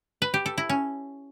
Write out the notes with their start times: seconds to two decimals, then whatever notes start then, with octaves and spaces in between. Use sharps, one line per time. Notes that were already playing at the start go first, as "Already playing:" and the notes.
0.22 B4
0.34 G4
0.46 A4
0.58 E4
0.69 C#4